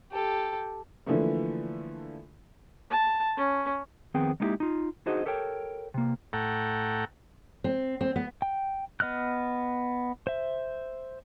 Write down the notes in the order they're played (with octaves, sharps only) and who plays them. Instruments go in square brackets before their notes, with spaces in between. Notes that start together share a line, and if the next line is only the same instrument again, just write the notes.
[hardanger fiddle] G4 A4
[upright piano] D3 E3 F3 A3 A#3
[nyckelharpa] A5
C#4
[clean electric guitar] F2 D#3 B3 C4 G#4 G5
G#3 A#3 B3 D#4 E4 G4
D#4 F4
D4 D#4 F#4 G#4 C5 D#5
G4 A4 A#4 C#5 G5
C3 A#3
[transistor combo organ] A2 A4 F#5 G5 A#5
[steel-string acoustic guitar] C4
C4
B3
[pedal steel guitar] G5
B3 D#5 F6 F#6
C5 E5